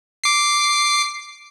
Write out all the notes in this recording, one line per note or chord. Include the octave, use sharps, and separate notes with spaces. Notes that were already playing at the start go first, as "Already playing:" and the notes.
D6 C7